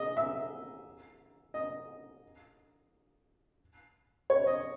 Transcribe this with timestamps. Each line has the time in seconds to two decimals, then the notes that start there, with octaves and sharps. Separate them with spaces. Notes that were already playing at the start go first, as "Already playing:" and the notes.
Already playing: G#4 D#5
0.17 E5
1.54 D#5
4.30 C#5
4.47 D#5